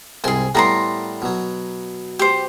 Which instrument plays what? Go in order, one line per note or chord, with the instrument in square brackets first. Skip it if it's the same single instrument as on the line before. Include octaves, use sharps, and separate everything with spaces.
[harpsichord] C2 G#2 C6 [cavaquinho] G#4 G#5
[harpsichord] A2 G3 B3 [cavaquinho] A#4 A#5 C6
[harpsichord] B2 F#3
[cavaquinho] G4 C5